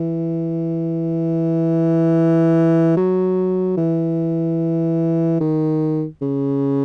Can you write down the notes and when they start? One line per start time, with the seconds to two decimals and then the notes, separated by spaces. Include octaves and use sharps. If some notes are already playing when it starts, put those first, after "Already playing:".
Already playing: E3
2.97 F#3
3.77 E3
5.41 D#3
6.22 C#3